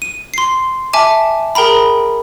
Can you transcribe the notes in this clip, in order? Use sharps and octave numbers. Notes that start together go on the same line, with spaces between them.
D#7
C6 C7
E5 G#5 A5 D6
G#4 A#4 G5 A#5 B5